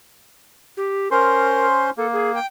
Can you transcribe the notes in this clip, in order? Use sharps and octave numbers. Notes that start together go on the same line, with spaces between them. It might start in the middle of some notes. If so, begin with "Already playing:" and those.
G4
C#4 A#4 C5 C6
A#3 A4
G#4
G5